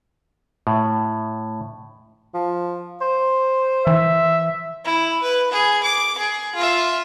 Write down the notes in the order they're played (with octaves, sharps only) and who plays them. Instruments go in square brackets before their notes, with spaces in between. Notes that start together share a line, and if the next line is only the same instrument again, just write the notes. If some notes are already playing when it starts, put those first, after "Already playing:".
[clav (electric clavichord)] A2
[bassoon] F3
C5
[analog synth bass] E3 [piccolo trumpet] E5
[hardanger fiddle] E4
B4
G#4
D6
G#4
F4 E5